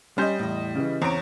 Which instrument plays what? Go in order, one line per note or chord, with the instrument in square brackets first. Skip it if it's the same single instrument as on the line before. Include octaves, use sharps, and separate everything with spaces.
[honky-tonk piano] G3 D#5 [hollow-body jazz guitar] C#4 [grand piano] C6 G6
[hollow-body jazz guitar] E2 A2
[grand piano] C#3 E3
[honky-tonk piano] E2 A#5 D7 [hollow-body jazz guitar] C4 C#5